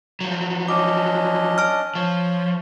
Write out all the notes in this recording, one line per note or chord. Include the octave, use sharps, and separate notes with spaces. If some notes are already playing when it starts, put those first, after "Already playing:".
F3 F#3
C#4 D4 D#5 D6
A5 F6
F3 C#5